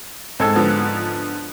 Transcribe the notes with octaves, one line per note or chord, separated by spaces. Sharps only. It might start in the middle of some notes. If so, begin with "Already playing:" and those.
G#2 C4 A4 E6 G#6
D3 F3 B3